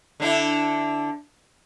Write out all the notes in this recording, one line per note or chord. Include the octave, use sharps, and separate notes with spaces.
D3 D4 E4